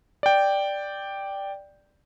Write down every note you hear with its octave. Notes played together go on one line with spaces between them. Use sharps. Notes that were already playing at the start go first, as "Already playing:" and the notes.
D5 G5